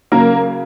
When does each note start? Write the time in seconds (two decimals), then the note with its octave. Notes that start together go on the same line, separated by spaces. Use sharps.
0.12 C#3 F#3 A#3 A#4